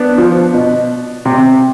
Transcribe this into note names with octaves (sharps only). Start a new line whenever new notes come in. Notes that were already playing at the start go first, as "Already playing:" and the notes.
Already playing: B3 D4
F3
B2
C3